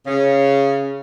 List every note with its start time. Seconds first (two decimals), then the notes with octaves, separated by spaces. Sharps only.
0.07 C#3